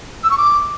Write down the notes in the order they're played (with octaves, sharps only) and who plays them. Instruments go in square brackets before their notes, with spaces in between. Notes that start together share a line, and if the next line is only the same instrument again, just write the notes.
[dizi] E6
C#6
D6